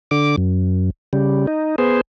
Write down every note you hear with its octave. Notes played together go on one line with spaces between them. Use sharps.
D3 D6
F#2
C#3 G3
D#4
B3 G#4 C5